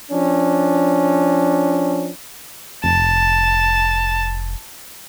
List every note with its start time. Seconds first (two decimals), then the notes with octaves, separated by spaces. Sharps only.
0.11 F3 C#4 D4
2.84 F1 A5